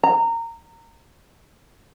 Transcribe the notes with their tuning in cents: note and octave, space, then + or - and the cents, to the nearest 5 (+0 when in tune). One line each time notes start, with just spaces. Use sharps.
A#5 -20